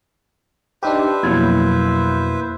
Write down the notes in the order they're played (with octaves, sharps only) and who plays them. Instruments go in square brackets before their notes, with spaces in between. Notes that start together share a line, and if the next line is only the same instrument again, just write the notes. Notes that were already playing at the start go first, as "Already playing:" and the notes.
[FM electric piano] D4 D#4 G4 [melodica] B4 C5 E5
[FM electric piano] F2 B2 F#3 [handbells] A#3 E4 G#6